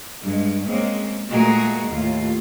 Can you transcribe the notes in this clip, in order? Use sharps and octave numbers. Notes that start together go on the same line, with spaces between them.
G2 G#3
G#3 A#3 C4 C#4
A#2 G#3 A3 F#4 G#4 A#4
D#2 A2 F4